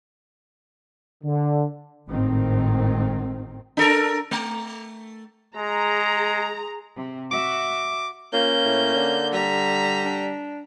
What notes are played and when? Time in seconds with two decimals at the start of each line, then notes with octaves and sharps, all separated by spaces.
1.24 D3
2.08 G#1 A2 D#3 C4
3.77 D4 A4 A#4
4.31 A3
5.56 G#3 G#4 A#5
6.96 C3
7.32 F#4 E5 D6
8.33 A#3 C#4 F4 G6
8.64 A2
8.96 D3
9.33 G3 A#5 B6
10.05 D4